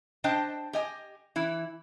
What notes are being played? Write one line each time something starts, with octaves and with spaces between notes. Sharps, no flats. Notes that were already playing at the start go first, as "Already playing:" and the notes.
D4 C5 D#5 G5 A5
G4 D#5 G#5
E3 E4